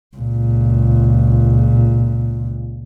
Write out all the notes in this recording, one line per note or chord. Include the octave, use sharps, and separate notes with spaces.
C#2 A#2